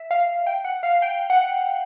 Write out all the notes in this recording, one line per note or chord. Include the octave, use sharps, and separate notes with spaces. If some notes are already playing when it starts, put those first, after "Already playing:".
Already playing: E5
F5
G5
F#5
F5
G5
F#5